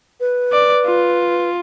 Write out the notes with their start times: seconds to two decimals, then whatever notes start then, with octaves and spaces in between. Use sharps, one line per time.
0.20 B4
0.53 D5
0.85 F4